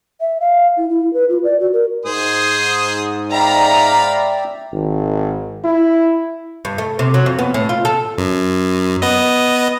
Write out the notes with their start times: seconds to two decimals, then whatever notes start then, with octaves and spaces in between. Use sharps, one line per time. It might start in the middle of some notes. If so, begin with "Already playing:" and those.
0.21 E5
0.41 F5
0.77 E4
0.89 E4
1.13 B4
1.29 F4
1.44 D5
1.60 F#4
1.73 A#4
2.06 G#2 G#4 C5 D#6
3.32 D5 E5 F5 G5 A#5 B5
4.72 G#1
5.64 E4
6.65 G2
6.78 A3
6.99 C3
7.14 F#3
7.26 F2
7.39 B3
7.54 A2
7.69 F4
7.85 A4
8.18 F#2
9.02 B3 D#5